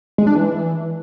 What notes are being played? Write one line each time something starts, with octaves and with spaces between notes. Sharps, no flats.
G#3
D4
E3